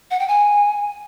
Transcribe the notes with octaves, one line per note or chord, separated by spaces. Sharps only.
F#5
G5
G#5